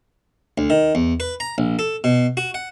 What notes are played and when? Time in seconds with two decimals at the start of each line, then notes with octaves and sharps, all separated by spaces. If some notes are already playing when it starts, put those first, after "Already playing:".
0.58 D2
0.70 D#3
0.95 E2
1.20 B4
1.40 A#5
1.58 A#1
1.79 A4
2.04 B2
2.37 F#4
2.54 F#5